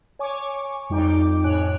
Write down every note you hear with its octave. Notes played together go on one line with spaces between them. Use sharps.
C#5 G#5 C#6 D6
F2 G3 D#4 G5 D6
F2 A2 C#5 G#5 F#6 D7